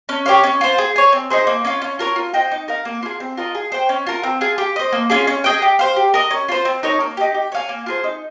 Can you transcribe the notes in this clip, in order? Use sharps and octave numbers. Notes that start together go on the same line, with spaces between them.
C#4
G4 C#5 F5
C#4
F4 C5
G#4
C#5 G#5
C4
D#4 G#4 C5
A#3
C#4 F4
C#4
F4 A#4 C#5
F4
C5 D#5 G5
D#4
A#4 F5
A#3
F4 G#4
C4
F4 A#4 D#5
G#4
C5 G5
C#4
F4 A#4
C4
F4 G#4
G4
C5 D#5
A#3
C#4 F4 G#4
C#4
G#4 D#5 G5
G4
C5 F5
G4
A#4 D#5
C#4
F4 C5
C4
D#4 A#4 C#5
A#3
D#4 G4
G4
C#5 F5 G#5
A#3
F4 G#4 C5
D#4